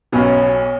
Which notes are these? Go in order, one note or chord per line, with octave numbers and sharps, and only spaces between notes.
B1 B2 F#3 B3 C#4